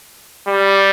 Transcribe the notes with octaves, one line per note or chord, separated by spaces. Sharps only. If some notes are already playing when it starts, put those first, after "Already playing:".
G3